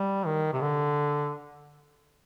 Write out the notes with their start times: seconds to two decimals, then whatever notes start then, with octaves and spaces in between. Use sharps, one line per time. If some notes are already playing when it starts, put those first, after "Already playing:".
Already playing: G3
0.26 D#3
0.53 C3
0.62 D3